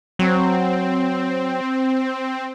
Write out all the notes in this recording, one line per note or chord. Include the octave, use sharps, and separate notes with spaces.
F#3 C4